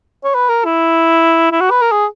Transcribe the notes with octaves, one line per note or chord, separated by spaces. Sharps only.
C#5
B4
A#4
E4
E4
F#4
B4
A#4
G#4